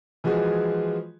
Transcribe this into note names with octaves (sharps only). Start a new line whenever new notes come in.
E3 F3 G#3 F#4 G#4